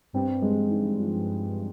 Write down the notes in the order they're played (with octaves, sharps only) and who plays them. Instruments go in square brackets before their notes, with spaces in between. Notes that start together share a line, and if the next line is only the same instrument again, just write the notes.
[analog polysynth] G2 [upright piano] C4
[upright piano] G#3
D#4
F3